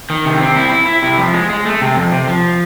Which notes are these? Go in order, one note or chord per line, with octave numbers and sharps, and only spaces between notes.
D#3
C3
C4
E4
E4
E4
C3
F3
G#3
G#3
A3
C3
F2
C3
F3